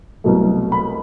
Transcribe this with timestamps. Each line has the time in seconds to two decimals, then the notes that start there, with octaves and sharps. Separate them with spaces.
0.24 C2 B2 F#3 A3
0.72 B5